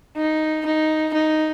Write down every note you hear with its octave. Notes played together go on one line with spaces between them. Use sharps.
D#4
D#4
D#4